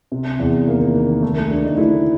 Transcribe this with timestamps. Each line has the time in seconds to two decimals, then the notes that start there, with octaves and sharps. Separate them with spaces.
0.12 C3
0.39 E2
0.67 D#3 A#3
0.95 D#3
1.22 D#3 A3
1.37 A3
1.50 D2 D4
1.64 D#4
1.77 D2 E4